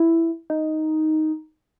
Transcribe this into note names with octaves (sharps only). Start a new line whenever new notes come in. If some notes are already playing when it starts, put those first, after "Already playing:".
Already playing: E4
D#4